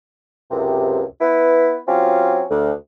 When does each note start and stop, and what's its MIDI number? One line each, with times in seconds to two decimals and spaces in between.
0.51 1.03 37
0.51 1.03 42
0.51 1.03 48
1.21 1.79 59
1.21 1.79 64
1.21 1.79 71
1.88 2.43 54
1.88 2.43 60
1.88 2.43 61
1.88 2.43 65
1.88 2.43 67
2.50 2.72 38